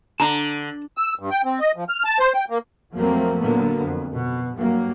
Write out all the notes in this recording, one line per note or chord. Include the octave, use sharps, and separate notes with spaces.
D3 A5 A#5
E6
G2
G5
C4
D#5
F3
F6
A5
C5
G5
A#3
F2 F3 F#3 A3 A#3 C4
A#2 D3 F#3 A#3 B3
F2
B2
G2 F#3 A#3